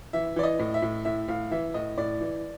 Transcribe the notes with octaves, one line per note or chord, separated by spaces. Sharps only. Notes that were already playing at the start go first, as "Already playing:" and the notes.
E3 E5
E3 D5
D#5
A2
E5
A2
A2 E5
A2 F5
E3 E5
A2 D#5
A2 D5
E3